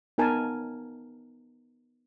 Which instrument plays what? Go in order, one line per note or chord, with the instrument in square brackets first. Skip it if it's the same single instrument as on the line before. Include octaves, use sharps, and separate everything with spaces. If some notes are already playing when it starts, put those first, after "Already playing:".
[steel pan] B3 D#4 A#4 G#5 A5